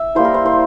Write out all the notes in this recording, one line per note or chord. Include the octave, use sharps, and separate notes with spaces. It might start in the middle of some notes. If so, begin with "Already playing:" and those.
Already playing: E5
G3 A#3 E4 C5
A#4
C5
C5